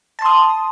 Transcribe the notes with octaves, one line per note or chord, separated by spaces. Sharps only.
A5 C6 D#6